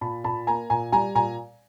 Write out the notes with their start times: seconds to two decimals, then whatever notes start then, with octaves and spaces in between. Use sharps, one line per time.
0.01 A#2 A5 B5
0.24 A#2 A5 B5
0.47 A#3 G#5 A#5
0.70 A#2 G#5 A#5
0.92 G3 G#5 A#5
1.15 A#2 G#5 A#5